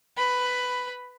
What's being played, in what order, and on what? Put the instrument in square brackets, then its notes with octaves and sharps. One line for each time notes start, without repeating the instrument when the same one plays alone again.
[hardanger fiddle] B4 B5